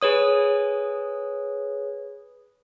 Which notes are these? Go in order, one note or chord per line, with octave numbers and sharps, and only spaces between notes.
G#4 B4 C#5 D#6